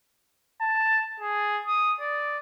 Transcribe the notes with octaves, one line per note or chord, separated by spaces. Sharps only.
A5
G#4
D#6
D5